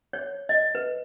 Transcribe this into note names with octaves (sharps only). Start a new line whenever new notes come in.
C#5
D#5
B4